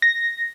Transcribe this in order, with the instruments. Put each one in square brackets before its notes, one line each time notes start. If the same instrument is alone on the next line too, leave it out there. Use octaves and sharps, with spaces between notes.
[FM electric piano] A#6